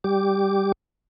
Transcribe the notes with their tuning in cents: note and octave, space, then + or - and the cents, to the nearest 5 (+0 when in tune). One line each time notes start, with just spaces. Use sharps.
G3 +0 G4 +0 D6 -5